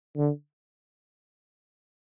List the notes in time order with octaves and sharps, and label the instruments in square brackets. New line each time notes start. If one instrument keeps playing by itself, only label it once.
[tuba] D3